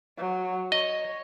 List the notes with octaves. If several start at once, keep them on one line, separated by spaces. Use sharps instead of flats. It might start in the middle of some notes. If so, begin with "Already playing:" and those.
F#3
C#5 D#5